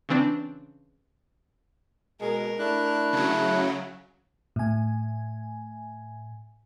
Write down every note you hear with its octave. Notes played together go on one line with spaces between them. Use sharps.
C#3 E3 C4 D4
B2 G#3 A#4
A3 D4 E4 F#6
C#3 F#3
A2 G#5